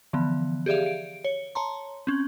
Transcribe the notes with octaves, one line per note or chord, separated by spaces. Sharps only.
D3 E3 F3 B3
G4 G#4 D5 E5 F5
D7
C#5
C#5 A5 A#5 C6
C4 C#4